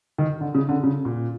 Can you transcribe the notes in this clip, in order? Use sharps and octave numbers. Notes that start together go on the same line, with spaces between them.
D#3
D3
C#3
D3
C#3
A#2